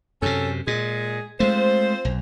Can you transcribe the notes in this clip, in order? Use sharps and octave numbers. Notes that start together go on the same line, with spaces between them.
F#2 C3 C#4 A4
A#2 G#3 G#4
G#3 A3 C4 F4 C5
B1